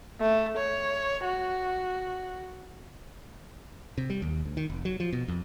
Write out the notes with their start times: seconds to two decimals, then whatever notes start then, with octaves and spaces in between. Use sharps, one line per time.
0.20 A3
0.57 C#5
1.25 F#4
3.98 C3
4.10 G3
4.22 D#2
4.45 D2
4.57 D#3
4.70 F1
4.85 F#3
5.00 F3
5.12 B2
5.28 F2